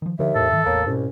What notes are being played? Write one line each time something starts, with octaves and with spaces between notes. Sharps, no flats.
D#3 F3
D#2 D3 F3 E5
E2 A2 A4
G#2 D#3 E3
A1 E2 A#3 C#5
C2 G#2 B2 C#4